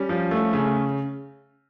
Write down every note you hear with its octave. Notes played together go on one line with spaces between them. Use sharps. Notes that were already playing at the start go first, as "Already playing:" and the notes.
Already playing: G3 C#4
F3
A3
C#3